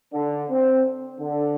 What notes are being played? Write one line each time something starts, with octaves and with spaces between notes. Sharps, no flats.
D3
C4
D3